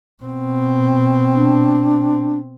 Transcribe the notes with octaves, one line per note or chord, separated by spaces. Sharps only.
B2 C4
D4